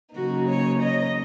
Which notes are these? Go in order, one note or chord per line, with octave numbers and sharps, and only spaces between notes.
C#3 F#3 A#3 D#4 F#4
C#5
D#5